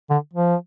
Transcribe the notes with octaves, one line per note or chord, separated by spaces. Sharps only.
D3
F3